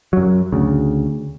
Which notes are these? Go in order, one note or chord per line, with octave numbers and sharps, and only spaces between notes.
F#2 F#3
D2 C#3